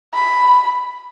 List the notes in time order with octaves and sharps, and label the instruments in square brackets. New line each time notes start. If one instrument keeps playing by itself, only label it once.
[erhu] B5